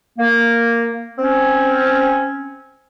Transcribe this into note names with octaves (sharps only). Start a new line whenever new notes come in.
A#3
C4 C#4